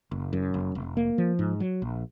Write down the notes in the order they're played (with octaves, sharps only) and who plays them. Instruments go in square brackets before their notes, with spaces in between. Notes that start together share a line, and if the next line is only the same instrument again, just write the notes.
[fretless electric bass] F#1
F#2
F#1
F1
A#3
F3
G#2
F#3
A#1